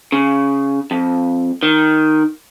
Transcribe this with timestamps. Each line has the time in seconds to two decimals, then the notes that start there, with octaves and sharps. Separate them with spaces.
0.12 C#3
0.91 F2
1.63 D#3